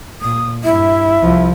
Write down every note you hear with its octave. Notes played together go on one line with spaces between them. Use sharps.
A#2 D#6
G2 E4 E5
C2 F3